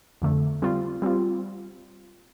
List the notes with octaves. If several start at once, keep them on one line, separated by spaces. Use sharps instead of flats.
F2 D3 A3
G3 C4 F4
G3 C4 F4